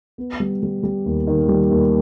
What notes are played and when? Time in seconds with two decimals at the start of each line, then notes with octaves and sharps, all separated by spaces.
0.18 B3
0.40 G3
0.63 G3
0.83 G3
1.06 D#2
1.27 D#3
1.48 G3
1.71 D#2